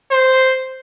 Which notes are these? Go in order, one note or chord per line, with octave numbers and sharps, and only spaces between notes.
C5